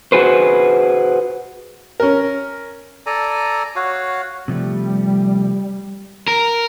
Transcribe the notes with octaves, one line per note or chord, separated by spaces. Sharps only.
F#4 G#4 B4 C5
C#4 A#4
A4 D5 G#5 A#5
F#4 C#5 F5
C3 F3 G3 A3
A#4